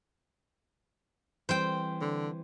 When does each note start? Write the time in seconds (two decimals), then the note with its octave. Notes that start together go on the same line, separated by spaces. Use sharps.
1.49 E3 G3 C4 C5 G5
2.01 D3